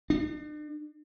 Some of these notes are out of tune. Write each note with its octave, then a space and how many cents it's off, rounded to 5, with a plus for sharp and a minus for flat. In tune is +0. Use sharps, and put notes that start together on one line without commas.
D4 +45